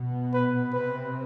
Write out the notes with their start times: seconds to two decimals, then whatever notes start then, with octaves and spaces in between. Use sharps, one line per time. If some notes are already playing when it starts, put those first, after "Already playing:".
Already playing: B2 B3
0.33 B4
0.73 C3 C4 B4